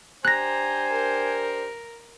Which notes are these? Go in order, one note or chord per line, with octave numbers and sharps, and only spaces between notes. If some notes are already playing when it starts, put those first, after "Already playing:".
D4 G4 C5 G#5 A#5 F#6 A#6
A#4